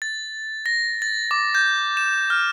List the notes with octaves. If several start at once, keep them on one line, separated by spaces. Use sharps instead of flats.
A6
A#6
A6
D6
G6
E7
F6